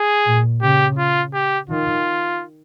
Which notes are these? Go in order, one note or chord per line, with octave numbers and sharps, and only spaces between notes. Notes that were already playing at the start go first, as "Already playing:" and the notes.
Already playing: G#4
A#2
C#3 G4
F4
G4
D#3 F4